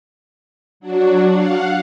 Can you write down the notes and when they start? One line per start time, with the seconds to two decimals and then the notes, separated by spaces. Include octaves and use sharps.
0.80 F#3 D4 F#4
1.28 F5 F#5